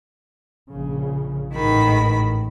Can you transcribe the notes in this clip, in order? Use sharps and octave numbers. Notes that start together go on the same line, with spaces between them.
A#1 C#3
A1 G#2 D#3 B5